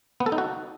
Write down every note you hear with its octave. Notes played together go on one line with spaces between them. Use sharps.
B3
A4
D#4
F#4